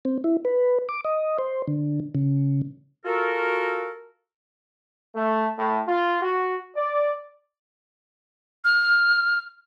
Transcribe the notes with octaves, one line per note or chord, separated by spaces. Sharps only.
C4
E4
B4
D6
D#5
C5
D3
C#3
F4 F#4 A4 A#4
A3
A2
F4
F#4
D5
F6